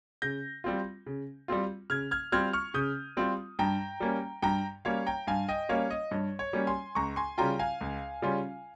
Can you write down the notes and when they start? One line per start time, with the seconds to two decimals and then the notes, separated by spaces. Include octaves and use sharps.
0.22 C#3 G6 A#6
0.64 G3 C4 F4
1.06 C#3
1.48 G3 C4 F4
1.90 C#3 F6 G#6
2.11 F6 G#6
2.32 G3 C4 F4 F6 G#6
2.53 C#6 F6
2.74 C#3 D#6 G6
3.17 G3 C4 F4
3.59 G2 G5 A#5
4.00 G3 A#3 C#4
4.42 G2 G5 A#5
4.85 G3 A#3 C#4 C#5 F5
5.06 G5 A#5
5.27 G2 F5 G#5
5.48 D#5 G5
5.69 G3 A#3 C#4 C#5 F5
5.91 D#5
6.11 G2 C#5
6.39 C#5
6.53 G3 A#3 C#4
6.67 G#5 C6
6.95 C#2 A#5 C#6
7.16 G#5 C6
7.38 C#3 G3 C#4 F4 G5 A#5
7.59 F5 G#5
7.81 C#2
8.22 C#3 G3 C#4 F4